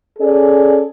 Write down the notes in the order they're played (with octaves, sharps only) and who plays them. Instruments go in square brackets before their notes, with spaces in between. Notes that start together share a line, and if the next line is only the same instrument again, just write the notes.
[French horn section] C#4 G#4 A4 D5